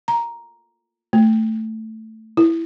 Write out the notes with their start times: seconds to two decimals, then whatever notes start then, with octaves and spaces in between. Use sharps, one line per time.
0.08 A#5
1.13 A3
2.37 E4